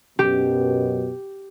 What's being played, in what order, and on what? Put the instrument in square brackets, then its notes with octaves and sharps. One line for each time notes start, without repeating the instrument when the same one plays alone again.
[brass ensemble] F#2 B2 [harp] G4